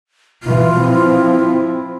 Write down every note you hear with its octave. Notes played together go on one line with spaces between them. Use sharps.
B2 E3 F4
F3 C4 E4